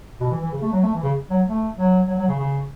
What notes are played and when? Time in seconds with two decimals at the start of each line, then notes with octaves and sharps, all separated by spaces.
0.21 B2
0.31 E3
0.41 E3
0.52 C#3
0.62 A3
0.72 F#3
0.83 A3
0.94 E3
1.03 C#3
1.30 F#3
1.46 A3
1.77 F#3
2.07 F#3
2.18 F#3
2.28 C#3
2.39 C#3